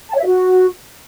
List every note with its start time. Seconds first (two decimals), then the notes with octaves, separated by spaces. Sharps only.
0.09 A5
0.14 C#5
0.20 E5
0.25 F#4